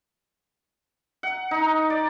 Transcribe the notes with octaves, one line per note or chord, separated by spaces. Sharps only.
F#5
D#4
D5